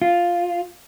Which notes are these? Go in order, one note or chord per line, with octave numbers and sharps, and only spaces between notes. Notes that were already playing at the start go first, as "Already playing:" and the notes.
F4